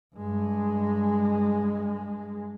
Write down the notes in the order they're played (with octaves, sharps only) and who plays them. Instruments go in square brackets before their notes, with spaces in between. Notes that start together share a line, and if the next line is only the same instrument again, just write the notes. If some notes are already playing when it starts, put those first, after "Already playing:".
[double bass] G2 G#3